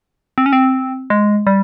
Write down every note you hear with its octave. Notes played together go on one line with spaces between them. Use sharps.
C4
C#4
C4
G#3
G3